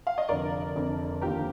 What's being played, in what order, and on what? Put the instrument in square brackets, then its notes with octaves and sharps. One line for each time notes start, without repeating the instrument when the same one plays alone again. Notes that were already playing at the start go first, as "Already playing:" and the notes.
[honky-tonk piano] F5
D#5
[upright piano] F1 F2 D3 [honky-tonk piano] A#4 D5
[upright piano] F1 F2 D3
[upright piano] D#2 D3 F3 C4 F4 [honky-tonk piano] G4 A#4